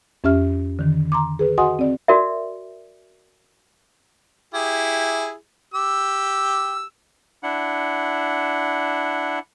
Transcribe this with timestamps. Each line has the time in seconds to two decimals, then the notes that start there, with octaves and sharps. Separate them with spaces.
0.24 F2 C#4 G4 E5 F6
0.79 D3 D#3
1.12 A#5 C6 D6
1.39 G#4 B4
1.58 F#4 D#5 F#5 G#5 C6 D#6
1.79 C4 D5
2.08 F#4 A#4 D5 E5
4.54 E4 G4 G#4
5.74 G4 E6
7.43 D4 E4 F#5